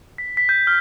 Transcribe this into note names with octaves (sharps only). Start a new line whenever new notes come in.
B6
B6
G6
F6